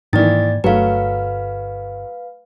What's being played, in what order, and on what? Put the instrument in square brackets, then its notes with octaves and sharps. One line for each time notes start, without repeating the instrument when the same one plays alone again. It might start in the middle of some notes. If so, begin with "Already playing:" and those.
[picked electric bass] G#2 A#3 [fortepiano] D#3 E3 [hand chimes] D5 A6
[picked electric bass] G1 [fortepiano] F#3 A3 [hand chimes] B4 F5